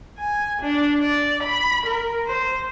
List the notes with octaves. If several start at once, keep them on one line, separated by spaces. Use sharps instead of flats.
G#5
D4
D5
B5
A#4
C5